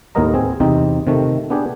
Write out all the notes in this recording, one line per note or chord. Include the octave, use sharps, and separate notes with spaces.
D#2 A2 B3 A#4 D#5 A#5
C4 G#4
E2 C3 C4 D#4
C3 D#3 A3
B3 D4 G4 G#4